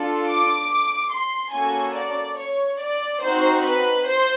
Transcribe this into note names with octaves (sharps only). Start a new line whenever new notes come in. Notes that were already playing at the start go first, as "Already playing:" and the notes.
Already playing: D4 F4 A4
D6
C6
A#3 C#4 F#4 A4 G#5
D5
C#5
D5
C4 D#4 F#4 C5
B4
C5